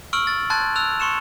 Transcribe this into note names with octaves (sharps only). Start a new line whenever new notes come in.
C#6 E6 F6 D7 F#7
A6
A5 C6 F#6 G#6 A6
E6 F#6 F7
C6 C#6 C#7 E7